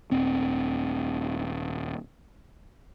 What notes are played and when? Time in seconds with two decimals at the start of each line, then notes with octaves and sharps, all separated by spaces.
0.11 D#1 C4